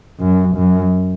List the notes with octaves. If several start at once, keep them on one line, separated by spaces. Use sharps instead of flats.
F#2
F#2